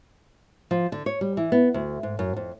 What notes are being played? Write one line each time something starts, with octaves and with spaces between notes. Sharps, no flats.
F3
D3
C#5
G3
E3
B3
D2
G#2
F#2
F2